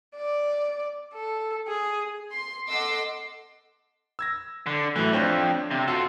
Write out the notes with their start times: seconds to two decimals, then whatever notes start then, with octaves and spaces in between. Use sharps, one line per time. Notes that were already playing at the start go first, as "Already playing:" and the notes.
0.15 D5
1.14 A4
1.68 G#4
2.31 C6
2.67 A4 D#5 F#5 C6 D6 E6
4.19 E6 G#6 A#6
4.66 D3
4.96 A2 E3 F#3 A3
5.12 F2 D4 C5 C#5
5.71 C3
5.88 F4 F#4 A4